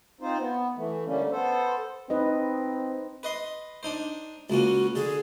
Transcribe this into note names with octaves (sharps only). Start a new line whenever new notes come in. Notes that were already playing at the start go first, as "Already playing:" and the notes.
C4 D#4 F4 C5
B3
E3 A3
D3 G3 A3 A#3 C#4
B3 A4 C5
C4 D#4 B4 D#5
B4 D#5 C6
D4 D#4 C5
C#2 A#3 C#4 F#4
D3 G#4